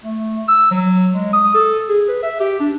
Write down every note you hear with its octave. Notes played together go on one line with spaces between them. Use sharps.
A3
E6
F#3
G#3
D#6
A4
G#4
B4
E5
G4
D4